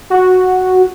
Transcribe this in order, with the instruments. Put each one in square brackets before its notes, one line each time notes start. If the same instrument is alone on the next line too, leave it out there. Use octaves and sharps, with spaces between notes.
[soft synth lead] F#4